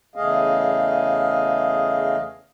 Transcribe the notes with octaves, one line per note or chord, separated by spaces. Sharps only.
E2 C#3 A3 G#4 D#5 F5